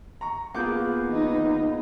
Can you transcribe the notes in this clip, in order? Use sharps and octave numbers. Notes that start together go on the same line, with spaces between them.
A#5 C#6
A#3 B3 F4 G#4 F#5 D6 G6
D#3 D#4